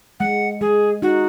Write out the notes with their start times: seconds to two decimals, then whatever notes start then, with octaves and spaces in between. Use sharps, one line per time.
0.20 G#3 F#5
0.61 G#3 G#4
1.02 D#4 F#4